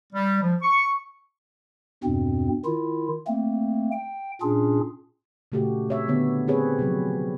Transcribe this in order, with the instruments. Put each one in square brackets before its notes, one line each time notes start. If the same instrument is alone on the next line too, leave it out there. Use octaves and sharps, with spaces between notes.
[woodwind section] G3
F3
C#6
[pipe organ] E2 G2 B2 C4
D#3 E4 F4
A3 A#3 C4
G5
A#2 C#4 D4 F4 G#4
[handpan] A#2 C#3 A3 F#4 G4
C4 C#5 E5
D3 B3 C#5
C4 G4 G#4 B4 C#5
C3 F3 F#3